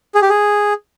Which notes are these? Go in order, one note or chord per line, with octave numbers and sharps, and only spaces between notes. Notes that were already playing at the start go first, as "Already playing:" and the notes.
G#4
G4
G#4